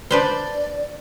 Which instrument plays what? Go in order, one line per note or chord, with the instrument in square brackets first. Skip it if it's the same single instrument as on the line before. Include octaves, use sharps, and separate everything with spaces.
[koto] D4 B4 C5 [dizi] D5